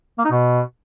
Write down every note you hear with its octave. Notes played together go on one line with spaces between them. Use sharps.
A#3
D#4
B2